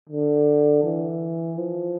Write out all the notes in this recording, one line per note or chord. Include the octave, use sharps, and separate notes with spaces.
D3
E3
F3